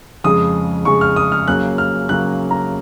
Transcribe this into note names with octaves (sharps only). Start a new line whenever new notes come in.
F2 C#3 G#3 D#6
F2 C#3 G#3 C#6
F6
D#6
F6
C#3 F#3 A#3 C#4 F#6
F6
C#3 F#3 A#3 C#4 F#6
A#5